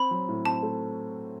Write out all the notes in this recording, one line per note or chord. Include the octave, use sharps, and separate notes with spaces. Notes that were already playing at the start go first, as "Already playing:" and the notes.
Already playing: C4 B5
F#3
A2
C4 A5
A3